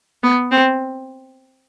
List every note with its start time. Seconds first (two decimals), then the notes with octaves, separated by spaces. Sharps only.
0.23 B3
0.52 C4